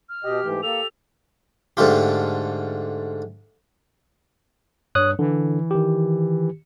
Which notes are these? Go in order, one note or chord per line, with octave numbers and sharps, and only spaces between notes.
F6
B2 G4 D#5
G#2 E3 A3
A#3 G4 A4 F7
G#2 D3 A3 F4 G4
G2 C#5 D#6 F#6
D3 E3
D#3 G4